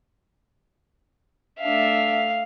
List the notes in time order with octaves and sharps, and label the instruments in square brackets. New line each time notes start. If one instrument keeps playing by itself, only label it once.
[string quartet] A3 D4 E5 [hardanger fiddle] F5